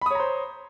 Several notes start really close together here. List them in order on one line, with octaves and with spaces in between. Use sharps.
B5 D#6 C#5 A#5 C5